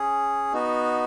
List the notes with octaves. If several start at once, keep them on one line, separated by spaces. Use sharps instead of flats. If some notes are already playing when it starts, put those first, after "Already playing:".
Already playing: C#4 G#4
B3 D#4 F#4